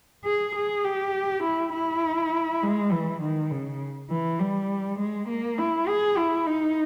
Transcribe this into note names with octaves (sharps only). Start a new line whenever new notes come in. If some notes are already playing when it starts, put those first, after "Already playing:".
G#4
G#4
G4
E4
E4
G#3
E3
D#3
C#3
E3
G3
G#3
A#3
E4
G#4
E4
D#4